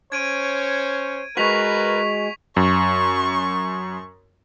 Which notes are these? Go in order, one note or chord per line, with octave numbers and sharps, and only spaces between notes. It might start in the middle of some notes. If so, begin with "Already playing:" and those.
C#4 C5 C#5 G#6 D7 D#7
G#3 F#4 A#4 B4 C#6 B6 F7
F#2 C#6